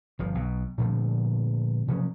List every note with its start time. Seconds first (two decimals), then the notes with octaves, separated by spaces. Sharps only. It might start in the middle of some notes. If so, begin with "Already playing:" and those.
0.19 G1 F3
0.35 B1 B2
0.78 A#2 D3 F3 A3
1.88 C3 F3 F#3 C#4